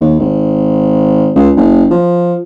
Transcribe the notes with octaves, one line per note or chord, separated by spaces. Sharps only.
D#2
G#1
C#2
F#1
F3